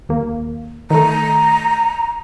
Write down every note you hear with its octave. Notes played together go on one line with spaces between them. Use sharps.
D#2 A#3
D#3 A3 A#5